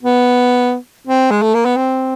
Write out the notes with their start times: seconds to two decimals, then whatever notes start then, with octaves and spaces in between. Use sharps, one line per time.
0.03 B3
1.07 C4
1.31 G#3
1.42 A3
1.54 A#3
1.65 B3
1.77 C4